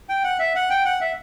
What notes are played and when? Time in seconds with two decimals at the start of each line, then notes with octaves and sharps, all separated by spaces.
0.09 G5
0.24 F#5
0.39 E5
0.55 F#5
0.70 G5
0.85 F#5
1.01 E5